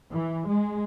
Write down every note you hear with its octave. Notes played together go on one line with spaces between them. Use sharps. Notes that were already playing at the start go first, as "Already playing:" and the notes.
E3
G#3